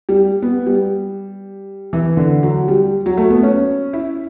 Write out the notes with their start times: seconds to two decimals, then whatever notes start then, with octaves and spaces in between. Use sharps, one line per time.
0.09 G3
0.42 B3
0.66 G3
1.93 E3
2.17 D3
2.43 F#3
2.68 G3
3.06 F#3
3.17 A3
3.30 B3
3.43 C#4
3.93 E4